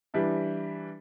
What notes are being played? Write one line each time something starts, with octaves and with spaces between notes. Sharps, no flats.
E3 G3 D4 E4